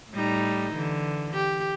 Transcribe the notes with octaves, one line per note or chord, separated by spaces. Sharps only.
A2 G3 D#4
D3 E3
G4